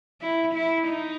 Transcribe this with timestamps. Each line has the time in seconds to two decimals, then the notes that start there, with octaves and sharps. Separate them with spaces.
0.21 E4
0.54 E4
0.88 D#4